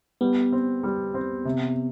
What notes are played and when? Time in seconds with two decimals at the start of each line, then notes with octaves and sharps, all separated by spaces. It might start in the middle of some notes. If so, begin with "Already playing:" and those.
0.21 G3 B3
0.52 C4
0.83 G3
1.14 C4
1.45 C3